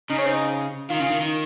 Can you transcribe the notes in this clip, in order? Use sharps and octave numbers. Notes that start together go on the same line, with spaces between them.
C#3 D#4
C#4
C4 D#4
D#3 F4
C#3
D#3
D#3